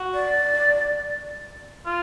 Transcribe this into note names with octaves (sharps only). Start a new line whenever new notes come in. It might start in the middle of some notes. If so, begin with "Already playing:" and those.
Already playing: F#4
D5
F4